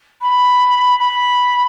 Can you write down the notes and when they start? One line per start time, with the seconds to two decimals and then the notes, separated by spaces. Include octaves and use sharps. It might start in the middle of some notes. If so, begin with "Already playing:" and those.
0.21 B5
1.00 B5